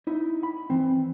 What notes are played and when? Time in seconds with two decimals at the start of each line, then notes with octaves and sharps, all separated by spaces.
0.07 D#4 E4
0.43 B5
0.70 E3 C4